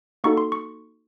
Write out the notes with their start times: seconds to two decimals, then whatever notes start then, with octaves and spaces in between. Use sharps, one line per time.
0.24 A#3 D#4 F#4 A4 C#6
0.37 C6
0.52 C#6